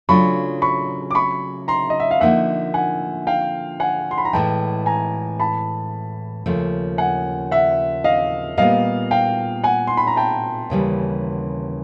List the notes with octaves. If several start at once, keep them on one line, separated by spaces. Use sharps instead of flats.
C#3 F#3 A3 D4 F4 B5 C#6
B5 C#6
D6
B5 C#6
A#5 C6
D#5
E5
F5
D3 F3 A#3 D#4 E5 F#5
F#5 G#5
F5 G5
F#5 G#5
C6
B5
A#5
A2 E3 G#3 G5 A5
G#5 A#5
A5 B5
D#2 C#3 F3 A3
F#5 G#5
E5 F#5
D#5 F5
A#2 G3 B3 D#5 F5
F5 G5
F#5 G#5
C6
B5
A#5
G5 A5
D#2 C#3 E3 G3